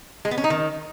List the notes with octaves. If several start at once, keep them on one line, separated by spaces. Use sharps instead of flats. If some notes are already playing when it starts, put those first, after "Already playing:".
G#3
B3
C#4
D#4
D#3